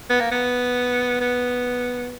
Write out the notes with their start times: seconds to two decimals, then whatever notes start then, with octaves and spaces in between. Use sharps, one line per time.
0.10 B3
0.20 A#3
0.31 B3
1.21 B3